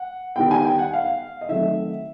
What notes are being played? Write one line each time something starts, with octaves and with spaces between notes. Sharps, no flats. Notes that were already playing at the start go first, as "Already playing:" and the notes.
Already playing: F#5
D#3 G3 B3 G5
G#5
G5
F#5
F5
D#5
D#3 F#3 A3 C4 E5